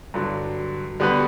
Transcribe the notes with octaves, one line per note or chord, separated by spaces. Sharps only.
G2 D3 F#3
D3 G3 B3 F#4 B4